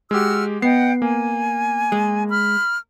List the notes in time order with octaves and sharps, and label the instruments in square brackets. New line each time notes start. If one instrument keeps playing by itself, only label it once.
[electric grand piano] G#3 G4 [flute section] F#4 E6 F6
[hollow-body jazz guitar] B3 [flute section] D#5 F#5 G5 [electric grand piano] C7
[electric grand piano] A#3 [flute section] G#5
[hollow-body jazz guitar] G#3
[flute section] B5 F6